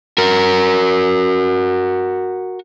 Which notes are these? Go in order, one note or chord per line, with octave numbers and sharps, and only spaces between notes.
F#4 A#4